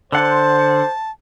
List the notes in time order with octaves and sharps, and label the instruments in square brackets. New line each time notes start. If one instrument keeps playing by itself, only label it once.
[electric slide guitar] D3 F#5 [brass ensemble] C5 [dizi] A5